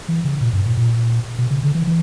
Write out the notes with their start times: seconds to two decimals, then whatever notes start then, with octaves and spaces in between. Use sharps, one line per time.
0.09 E3
0.24 C#3
0.41 A#2
0.53 G2
0.66 A#2
0.77 A#2
1.38 B2
1.51 C#3
1.63 D3
1.75 E3
1.87 E3